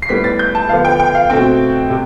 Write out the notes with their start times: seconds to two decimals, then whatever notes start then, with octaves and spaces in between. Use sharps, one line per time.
0.02 C7
0.09 A2 G3 B3 B6
0.24 A6
0.39 G6
0.55 A5
0.69 D3 F3 B3 F5
0.85 G5
1.00 G5
1.15 F5
1.30 B2 A3 C4 G5
1.90 C3